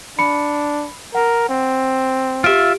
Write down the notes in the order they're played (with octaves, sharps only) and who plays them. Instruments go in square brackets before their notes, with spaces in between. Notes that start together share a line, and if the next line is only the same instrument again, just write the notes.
[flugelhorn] D4 [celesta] B5 C#7
[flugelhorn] A#4 [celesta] F#5
[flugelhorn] C4
[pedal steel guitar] F4 E5 [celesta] G4 D7